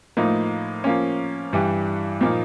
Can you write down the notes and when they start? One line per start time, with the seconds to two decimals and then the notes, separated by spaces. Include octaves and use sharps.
0.17 A2 F3 A#3 D#4
0.84 F3 A#3 C#4
1.53 G2 E3 G3
2.21 A#2 F3 A#3 D#4